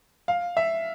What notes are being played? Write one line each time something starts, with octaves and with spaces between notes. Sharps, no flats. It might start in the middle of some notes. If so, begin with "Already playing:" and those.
F5
E5